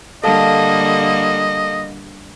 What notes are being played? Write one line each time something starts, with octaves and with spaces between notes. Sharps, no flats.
D3 G3 A#3 A4 D#5 F5 A5